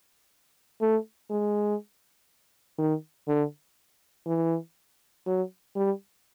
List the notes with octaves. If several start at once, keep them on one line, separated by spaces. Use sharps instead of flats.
A3
G#3
D#3
D3
E3
F#3
G3